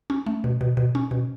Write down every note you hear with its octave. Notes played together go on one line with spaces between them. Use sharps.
C#4
A3
B2
B2
B2
C#4
B2